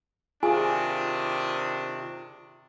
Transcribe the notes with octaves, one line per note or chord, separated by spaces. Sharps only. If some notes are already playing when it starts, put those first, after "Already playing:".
C3 D#3 D4 F4 G#4 G#5